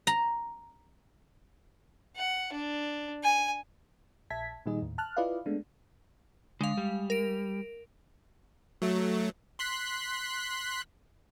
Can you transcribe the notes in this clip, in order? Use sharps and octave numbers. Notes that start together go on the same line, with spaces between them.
A#5
F#5
D4
G#5
A#1 E5 A5 G#6 B6
A#2 D#3 G3 D#4 G#4 D#5
D#2 A2
A5 F6 F#6
E4 F4 B4 D5 D#5 F5
G#3 A3 B3 D4
D3 G#3 F5
G3
A#4 D7
F#3 A3
C6 F#6 B6